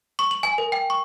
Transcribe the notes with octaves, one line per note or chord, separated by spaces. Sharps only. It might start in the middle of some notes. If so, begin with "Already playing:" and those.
C#6
F#7
G#5
A#4
G5
C#6